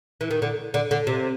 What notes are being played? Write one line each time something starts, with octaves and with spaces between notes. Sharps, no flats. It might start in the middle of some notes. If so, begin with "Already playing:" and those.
E3
D#3
D3
D3
D3
C3